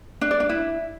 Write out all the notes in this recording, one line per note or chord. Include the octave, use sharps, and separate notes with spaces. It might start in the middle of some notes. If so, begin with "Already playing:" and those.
D4
D5
D4
E4